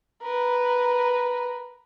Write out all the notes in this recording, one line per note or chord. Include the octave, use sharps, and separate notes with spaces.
A#4 B4